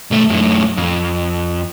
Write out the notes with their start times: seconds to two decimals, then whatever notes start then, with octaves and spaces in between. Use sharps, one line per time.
0.11 B1 A3
0.30 F#2 A2
0.77 F2